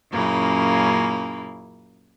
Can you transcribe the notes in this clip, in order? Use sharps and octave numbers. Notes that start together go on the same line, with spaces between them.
F#2 A#2 C#3 A#3 E4